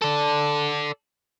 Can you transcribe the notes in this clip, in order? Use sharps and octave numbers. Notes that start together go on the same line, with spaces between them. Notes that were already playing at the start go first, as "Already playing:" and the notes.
A4 D5